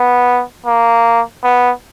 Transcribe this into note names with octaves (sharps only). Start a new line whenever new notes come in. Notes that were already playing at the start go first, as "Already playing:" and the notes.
Already playing: B3
A#3
B3